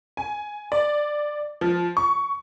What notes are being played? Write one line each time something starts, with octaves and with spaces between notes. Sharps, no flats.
G#5
D5
F3
C#6